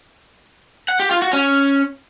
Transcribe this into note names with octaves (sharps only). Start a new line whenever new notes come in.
F#5
G4
F4
F#4
C#4